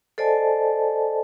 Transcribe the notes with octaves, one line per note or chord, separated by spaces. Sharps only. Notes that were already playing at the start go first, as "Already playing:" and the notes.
A4 C5 D5 D#5 G#5 A5